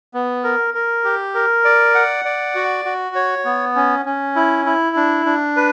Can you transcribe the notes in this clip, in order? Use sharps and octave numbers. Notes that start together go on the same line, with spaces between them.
B3
A#4
A#4
G4
A#4
D5
F#5
D5
F#4
F#4
C#5
B3
C#4
C#4
E4
E4
D4
D4
B4